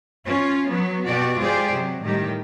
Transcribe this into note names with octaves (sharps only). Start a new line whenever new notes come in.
C#4 F4
F#3 B3
B2 F#4 G4 D5
G#3 F4 G4 G#4 C5 D5
C3 F#3
A2 D#3 G3 G4